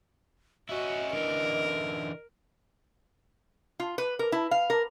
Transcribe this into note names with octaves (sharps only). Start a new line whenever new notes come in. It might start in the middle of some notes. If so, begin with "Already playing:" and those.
C#4 E4 F#4 D#5
D3 E3 A#4
F4
B4
A#4
E4
F5
A#4